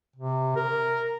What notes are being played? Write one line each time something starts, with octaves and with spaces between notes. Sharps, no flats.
C3
A#4